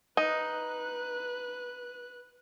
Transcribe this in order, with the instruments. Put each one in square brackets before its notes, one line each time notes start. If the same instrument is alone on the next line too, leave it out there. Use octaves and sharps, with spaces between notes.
[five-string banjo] D#4 [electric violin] B4 F#6